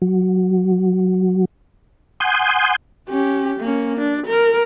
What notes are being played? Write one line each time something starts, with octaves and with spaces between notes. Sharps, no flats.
F#3
F#5 G#5 C6 D#6 G6
C#4 G4
A#3 C#4
D4
A#4